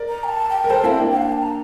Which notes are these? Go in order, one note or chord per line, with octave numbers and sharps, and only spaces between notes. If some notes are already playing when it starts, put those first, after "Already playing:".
Already playing: A#4 D5
A#5
G5
A5
G5
A#4
A4 C5 A5
C4 E4 F5
G5
A#3 D4
G5
F5
G5
A5
A#5